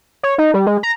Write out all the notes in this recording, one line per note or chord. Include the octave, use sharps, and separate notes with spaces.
C#5
D#4
G3
G#3
A#5